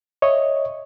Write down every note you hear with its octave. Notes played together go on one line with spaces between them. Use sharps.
C#5 D#5 E5